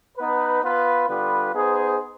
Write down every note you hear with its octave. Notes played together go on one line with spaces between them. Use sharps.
B3 D#4 B4
B3 F4 B4
D3 G3 B3 F4 B4
B3 D#4 G#4 C5